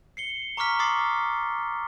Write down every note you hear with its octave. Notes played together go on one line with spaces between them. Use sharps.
C7 C#7 G7
A#5 C#6 D6 F6 B6
C6 D6 D#6 A6 C7